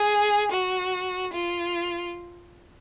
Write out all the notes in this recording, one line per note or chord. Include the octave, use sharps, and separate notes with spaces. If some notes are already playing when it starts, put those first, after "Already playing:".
Already playing: G#4
F#4
F4